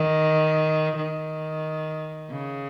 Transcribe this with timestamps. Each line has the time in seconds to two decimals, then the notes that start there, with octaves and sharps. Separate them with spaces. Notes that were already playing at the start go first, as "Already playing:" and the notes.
Already playing: D#3
0.96 D#3
2.30 C#3